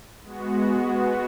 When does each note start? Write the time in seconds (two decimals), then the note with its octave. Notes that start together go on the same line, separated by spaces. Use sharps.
0.23 G#3 B3 F#4